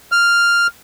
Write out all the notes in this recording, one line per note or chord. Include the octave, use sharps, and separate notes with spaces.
F6